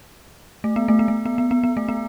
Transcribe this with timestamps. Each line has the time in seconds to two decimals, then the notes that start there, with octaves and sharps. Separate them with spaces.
0.64 A3
0.76 B3
0.88 A3
0.99 B3
1.08 A3
1.25 B3
1.38 B3
1.51 B3
1.63 B3
1.77 A3
1.88 B3